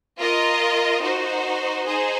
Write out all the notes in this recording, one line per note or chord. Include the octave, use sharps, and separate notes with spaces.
F4 A#4 D#5
D#4 F#4 C5
D#4 G#4 C5